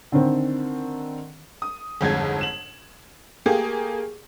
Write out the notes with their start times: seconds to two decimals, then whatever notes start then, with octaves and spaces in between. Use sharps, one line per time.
0.12 D3 D#3 C4
1.62 D#6
2.01 G1 F2 G#2 G#6
2.41 E7 F#7
3.46 A3 A#3 G4 G#4